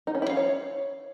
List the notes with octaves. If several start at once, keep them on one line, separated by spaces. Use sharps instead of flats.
D#4
C#4
E4
F5
C#5